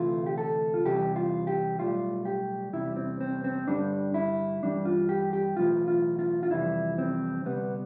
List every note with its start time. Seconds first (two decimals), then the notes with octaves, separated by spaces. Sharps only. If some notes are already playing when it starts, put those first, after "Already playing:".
Already playing: D2 C3 E3 A3 F4
0.26 G4
0.38 A4
0.74 F4
0.84 E2 C3 E3 G3 G4
1.16 F4
1.47 G4
1.79 B1 A2 G3 F4
2.25 G4
2.73 E2 C3 G3 E4
2.96 C4
3.21 C4
3.44 C4
3.67 G2 D3 G3 D4
4.14 E4
4.63 G2 E3 G3 D4
4.85 F4
5.09 G4
5.33 G4
5.57 B1 A2 E3 F4
5.88 F4
6.19 F4
6.43 F4
6.50 F2 C3 E3 G3 E4
6.98 C4
7.45 D2 C3 G3 B3